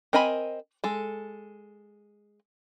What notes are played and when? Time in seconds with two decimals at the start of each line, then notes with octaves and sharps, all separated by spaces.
0.13 C4 A#4 D#5 G#5 B5
0.84 G#3 A4